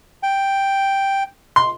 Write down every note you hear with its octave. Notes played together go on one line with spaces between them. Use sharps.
G5
C6